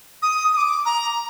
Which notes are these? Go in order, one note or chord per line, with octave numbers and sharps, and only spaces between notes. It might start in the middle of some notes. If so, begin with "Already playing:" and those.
D#6
D#6
D6
A#5